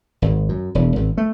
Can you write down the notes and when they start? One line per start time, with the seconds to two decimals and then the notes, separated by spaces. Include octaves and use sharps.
0.22 G#1
0.49 F#2
0.75 E1
0.96 G#1
1.18 A3